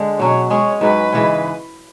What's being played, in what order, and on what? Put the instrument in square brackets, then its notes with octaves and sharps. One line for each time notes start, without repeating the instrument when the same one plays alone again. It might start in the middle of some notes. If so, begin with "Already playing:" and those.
Already playing: [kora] D3 G#3
[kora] B2 F#3 C#4 [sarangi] C#5
[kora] G#3 C#4 G#4 [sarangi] C#5
[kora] G#2 F#3 C#4 [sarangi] B4
[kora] C#3 E3 G#3 C#4